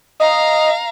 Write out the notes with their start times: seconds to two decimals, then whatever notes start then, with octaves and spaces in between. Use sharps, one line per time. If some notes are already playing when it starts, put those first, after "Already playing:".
0.20 D#5 F5 A#5